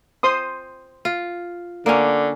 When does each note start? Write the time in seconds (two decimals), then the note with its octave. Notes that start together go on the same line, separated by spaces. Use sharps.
0.23 C5 C6 D#6
1.05 F4
1.86 D3 A#3 C#4